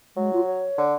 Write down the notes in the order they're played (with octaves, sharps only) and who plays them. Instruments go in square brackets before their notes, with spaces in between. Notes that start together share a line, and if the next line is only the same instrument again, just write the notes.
[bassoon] F#3 [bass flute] G#3
[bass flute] F4
C#5
[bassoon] D3